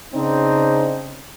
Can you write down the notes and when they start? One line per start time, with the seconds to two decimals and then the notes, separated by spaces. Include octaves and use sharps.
0.15 C#3 C4 D4 D#4